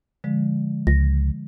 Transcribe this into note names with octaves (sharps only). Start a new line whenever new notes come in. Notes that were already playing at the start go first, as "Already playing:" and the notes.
D3 F3 G#3
C#2 A#6